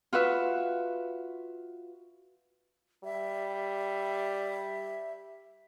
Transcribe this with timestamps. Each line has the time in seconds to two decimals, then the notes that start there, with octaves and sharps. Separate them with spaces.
0.13 F4 F#4 B4 E5
3.04 G3 E5